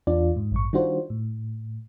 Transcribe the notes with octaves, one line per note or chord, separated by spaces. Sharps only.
E2 D4 F4 D5
G#2
A1 G2 C#6
D#3 G3 D4 F4 F#4 C5
A2